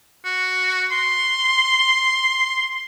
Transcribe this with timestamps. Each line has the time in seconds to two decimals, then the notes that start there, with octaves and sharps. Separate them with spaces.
0.25 F#4
0.91 C6